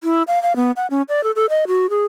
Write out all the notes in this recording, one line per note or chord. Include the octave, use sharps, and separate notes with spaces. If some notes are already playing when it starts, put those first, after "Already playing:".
E4
F5
F5
B3
F#5
C#4
D5
A4
A4
D#5
F#4
G#4